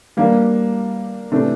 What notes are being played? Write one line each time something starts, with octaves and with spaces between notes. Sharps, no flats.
G3 A#3 D4
C3 E3 A3 D4